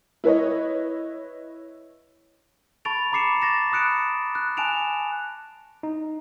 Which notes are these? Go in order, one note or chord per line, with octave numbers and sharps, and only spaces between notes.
E4 B4 C#5 D#5
A5 B5 C#6 A6 D7 F7
A#5 B5 D6 C7 C#7 E7
C#6 A6 A#6 E7
B5 D#6 F#6 C#7 D7 E7
F#6
G#5 A5 F#6 D7 E7 F7
D#4